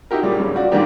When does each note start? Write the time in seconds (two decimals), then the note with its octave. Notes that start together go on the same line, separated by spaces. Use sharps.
0.11 D#4 E4 F#4 G4 A#4
0.23 A#2 C#3 G3
0.40 G2 C#3
0.55 F4 F#4 D5
0.72 G#2 D3 E3 G3 A#3 G4